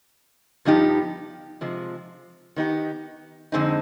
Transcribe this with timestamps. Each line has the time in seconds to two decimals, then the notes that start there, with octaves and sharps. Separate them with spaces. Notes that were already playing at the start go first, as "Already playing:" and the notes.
0.65 G2 F3 B3 D#4 G4
1.61 C3 F3 G#3
2.56 D#3 B3 D#4 G4
3.52 F2 D3 G#3 C4 D#4